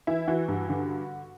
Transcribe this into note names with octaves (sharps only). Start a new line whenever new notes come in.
E3 E4
E3 F#4
G2
D3